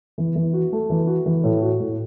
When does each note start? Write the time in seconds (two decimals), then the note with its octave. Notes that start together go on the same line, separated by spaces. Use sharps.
0.18 E3
0.36 E3
0.53 F#4
0.72 A3
0.90 E3
1.07 F#4
1.26 E3
1.44 A2
1.62 F#4
1.80 A2